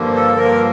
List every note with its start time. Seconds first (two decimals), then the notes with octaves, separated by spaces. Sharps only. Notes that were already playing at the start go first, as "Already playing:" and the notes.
Already playing: G2 D3 F3 A#3
0.14 A4
0.37 G2 D3 F3 A#3 A#4